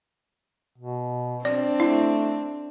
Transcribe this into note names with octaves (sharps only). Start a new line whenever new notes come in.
B2
C4 D4 D5
A3 E4